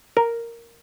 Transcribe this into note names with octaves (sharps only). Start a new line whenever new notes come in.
A#4